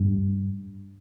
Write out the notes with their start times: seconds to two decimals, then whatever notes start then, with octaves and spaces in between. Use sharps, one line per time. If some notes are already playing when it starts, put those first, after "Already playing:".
Already playing: G2